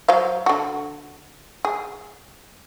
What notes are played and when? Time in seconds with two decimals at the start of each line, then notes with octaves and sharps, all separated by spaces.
0.08 F#3 C5 F5
0.46 D3 F#4
1.65 G#4